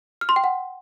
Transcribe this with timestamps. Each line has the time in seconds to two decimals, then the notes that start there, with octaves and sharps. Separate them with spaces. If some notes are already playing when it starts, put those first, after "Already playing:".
0.21 F6
0.29 C6
0.36 G5
0.44 F#5